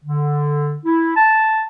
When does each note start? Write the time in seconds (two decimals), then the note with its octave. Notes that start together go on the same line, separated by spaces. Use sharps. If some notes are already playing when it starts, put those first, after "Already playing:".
0.04 D3
0.85 E4
1.15 A5